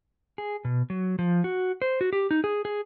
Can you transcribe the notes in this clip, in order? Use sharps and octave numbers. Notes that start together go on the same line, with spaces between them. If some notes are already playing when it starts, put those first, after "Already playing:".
G#4
B2
F#3
F3
F#4
C5
F#4
G4
D#4
G#4
G#4